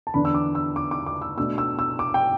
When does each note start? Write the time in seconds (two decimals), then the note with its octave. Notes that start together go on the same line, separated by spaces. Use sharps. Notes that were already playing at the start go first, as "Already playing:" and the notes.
0.07 A5
0.14 E2 D3 B3 D4 B5
0.25 E6
0.34 D6
0.55 E6
0.76 D6
0.91 D6
1.06 D6
1.22 E6
1.37 B2 A3 D4 E6
1.58 E6
1.79 E6
1.99 D6
2.14 G5